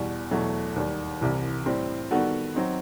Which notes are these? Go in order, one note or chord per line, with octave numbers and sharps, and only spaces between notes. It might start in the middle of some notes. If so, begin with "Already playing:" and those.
Already playing: E2 B2 G3
E2 B2 F#3 A3
D#2 D#3 G3
C2 C3 E3
A2 G3 C4
D#3 G3 B3 F#4 A4
F#3 C4 D#4